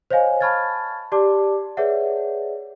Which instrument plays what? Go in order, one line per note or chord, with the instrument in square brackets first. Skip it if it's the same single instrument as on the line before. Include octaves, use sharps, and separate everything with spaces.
[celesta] C5 C#5 D#5 F5 G#5
A5 B5 C#6 F6 G#6 A6
G4 D5 A5 D6
G#4 B4 C#5 D5 E5 F#5